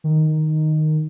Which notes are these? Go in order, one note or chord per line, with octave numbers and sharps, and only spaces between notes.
D#3